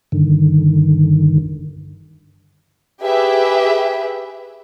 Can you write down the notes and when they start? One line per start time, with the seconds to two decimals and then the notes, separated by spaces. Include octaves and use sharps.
0.12 G2 D3 D#3
3.03 G4 G#4 B4 E5